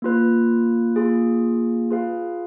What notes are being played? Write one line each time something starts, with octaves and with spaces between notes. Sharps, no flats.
A#3 F4 B4
A#3 F4 G#4
F4 G#4 B4 F5